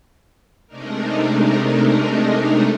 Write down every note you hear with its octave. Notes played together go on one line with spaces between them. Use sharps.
C3 G#3 A3 D4 D#4 A#4